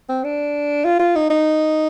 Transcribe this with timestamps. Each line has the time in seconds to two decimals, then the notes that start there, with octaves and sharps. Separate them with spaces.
0.09 C4
0.24 D4
0.85 F4
1.00 F4
1.16 D#4
1.30 D#4